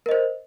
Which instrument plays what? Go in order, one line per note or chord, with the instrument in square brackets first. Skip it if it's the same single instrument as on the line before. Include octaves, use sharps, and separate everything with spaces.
[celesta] A#4
D#5
C5